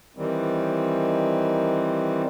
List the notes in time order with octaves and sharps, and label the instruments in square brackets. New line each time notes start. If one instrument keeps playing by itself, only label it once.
[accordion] D#3 E3 G3 C4